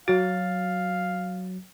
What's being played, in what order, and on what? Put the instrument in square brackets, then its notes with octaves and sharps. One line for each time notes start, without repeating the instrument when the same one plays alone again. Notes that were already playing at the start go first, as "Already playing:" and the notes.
[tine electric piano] F#3 A6 [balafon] F#4 [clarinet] F5